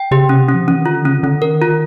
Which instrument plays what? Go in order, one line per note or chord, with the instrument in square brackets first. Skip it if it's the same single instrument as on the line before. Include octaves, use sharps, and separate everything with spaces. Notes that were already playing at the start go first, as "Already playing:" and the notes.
Already playing: [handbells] G5
[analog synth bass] C#3 [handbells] G4
[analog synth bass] C3 [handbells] C#4
[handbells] C#4
[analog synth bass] F3
[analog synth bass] E3 [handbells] C#4
[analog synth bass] D#3
[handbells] F4
[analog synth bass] D3
[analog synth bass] C#3 [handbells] C#4
[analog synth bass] D#3
[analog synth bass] D3 [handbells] C#4
[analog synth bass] D#3 [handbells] A#4
[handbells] F4